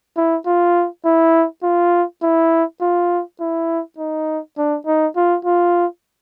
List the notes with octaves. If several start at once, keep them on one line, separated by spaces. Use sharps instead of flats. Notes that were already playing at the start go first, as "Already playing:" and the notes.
E4
F4
E4
F4
E4
F4
E4
D#4
D4
D#4
F4
F4